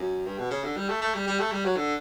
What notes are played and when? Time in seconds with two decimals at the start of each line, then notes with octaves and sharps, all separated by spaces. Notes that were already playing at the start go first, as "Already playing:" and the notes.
Already playing: F#2
0.26 G2
0.38 B2
0.51 C#3
0.64 D3
0.76 G3
0.89 A3
1.01 A3
1.14 G3
1.27 G3
1.39 A3
1.52 G3
1.65 F#3
1.77 D3